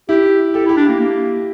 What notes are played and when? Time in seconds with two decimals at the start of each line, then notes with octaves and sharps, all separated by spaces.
0.09 E4 G4
0.54 G4 A4
0.66 E4
0.69 G4
0.77 D4
0.85 A#3 G4
1.00 A#3